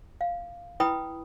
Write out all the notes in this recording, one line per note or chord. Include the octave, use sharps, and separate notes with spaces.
F5
E4 B4 G5 B5 D#6